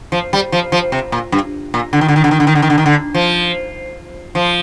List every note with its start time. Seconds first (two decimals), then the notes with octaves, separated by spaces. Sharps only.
0.12 F3
0.33 G3
0.52 F3
0.72 F3
0.92 C3
1.12 A#2
1.32 G2
1.74 A#2
1.93 D3
2.01 D#3
2.08 D3
2.16 D#3
2.24 D3
2.31 D#3
2.40 D3
2.47 D#3
2.55 D3
2.62 D#3
2.70 D3
2.78 D#3
2.86 D3
3.14 F3
4.35 F3